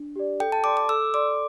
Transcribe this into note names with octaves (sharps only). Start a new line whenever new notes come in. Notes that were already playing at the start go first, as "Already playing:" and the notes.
Already playing: D4
G4 D5
A4 G5
A5
D5 C6 D6
D6
A4 E6
D5 C6 D6